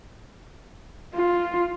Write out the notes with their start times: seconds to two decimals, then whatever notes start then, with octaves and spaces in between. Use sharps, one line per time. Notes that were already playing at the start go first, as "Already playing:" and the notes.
1.14 F4